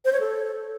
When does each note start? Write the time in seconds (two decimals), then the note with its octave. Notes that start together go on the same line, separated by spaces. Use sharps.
0.05 C5
0.13 C#5
0.20 A4